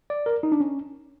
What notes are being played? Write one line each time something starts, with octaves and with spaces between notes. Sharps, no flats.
D5
A#4
D#4
D4
C#4